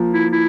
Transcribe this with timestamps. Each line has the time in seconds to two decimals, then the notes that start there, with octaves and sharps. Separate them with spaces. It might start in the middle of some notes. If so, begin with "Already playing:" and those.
Already playing: F3 A#3
0.12 E4
0.32 E4